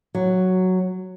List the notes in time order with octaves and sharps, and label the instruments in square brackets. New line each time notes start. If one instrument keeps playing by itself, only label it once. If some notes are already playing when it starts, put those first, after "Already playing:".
[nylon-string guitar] F#3